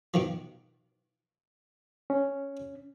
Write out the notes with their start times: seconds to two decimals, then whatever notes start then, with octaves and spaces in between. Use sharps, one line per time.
0.14 B2 D#3 F3
2.10 C#4